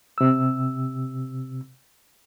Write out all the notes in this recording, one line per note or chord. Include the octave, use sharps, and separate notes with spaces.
C3 E6